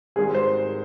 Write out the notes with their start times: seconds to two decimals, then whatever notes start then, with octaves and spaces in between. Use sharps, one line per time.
0.16 G#1 G#2 G3 G#4
0.35 C5